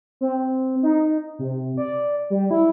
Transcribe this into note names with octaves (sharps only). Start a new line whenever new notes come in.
C4
D#4
C3
D5
G3
E4